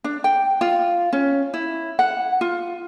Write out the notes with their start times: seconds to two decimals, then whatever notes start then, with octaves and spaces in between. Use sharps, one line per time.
0.04 D4
0.24 G5
0.61 F4
1.13 C#4
1.54 E4
1.99 F#5
2.41 F4